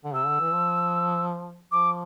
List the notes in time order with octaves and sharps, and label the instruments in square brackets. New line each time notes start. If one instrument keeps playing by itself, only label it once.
[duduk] D3
[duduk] C3 [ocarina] E6
[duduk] D3
E3
F3
[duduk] F3 [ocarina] D6